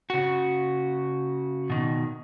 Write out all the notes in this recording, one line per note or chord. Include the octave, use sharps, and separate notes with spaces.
C#3 F#4
B2 D#3